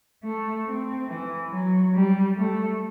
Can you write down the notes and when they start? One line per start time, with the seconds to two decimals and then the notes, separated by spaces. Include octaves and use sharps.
0.24 A3
0.66 C4
1.08 E3
1.51 F#3
1.93 G3
2.37 A3